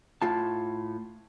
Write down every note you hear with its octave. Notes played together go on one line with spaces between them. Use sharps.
A2 F4 A5